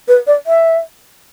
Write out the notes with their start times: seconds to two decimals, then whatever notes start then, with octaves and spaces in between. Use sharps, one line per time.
0.08 B4
0.27 D5
0.47 E5